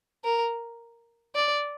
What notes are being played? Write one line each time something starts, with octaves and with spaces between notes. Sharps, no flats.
A#4
D5